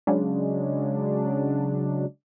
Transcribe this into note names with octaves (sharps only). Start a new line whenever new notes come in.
C#3 F#3 G#3 D4